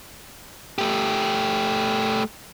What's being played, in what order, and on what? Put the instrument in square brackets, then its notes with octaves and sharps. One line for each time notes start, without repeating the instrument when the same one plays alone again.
[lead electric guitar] A3 G4